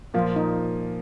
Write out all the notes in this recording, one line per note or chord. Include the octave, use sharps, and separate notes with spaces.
A#2 F3 A#3 F4
D#4